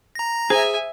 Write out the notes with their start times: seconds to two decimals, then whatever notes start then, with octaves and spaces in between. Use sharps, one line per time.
0.15 A#5 A#6
0.50 G#4 C5 E5 G#5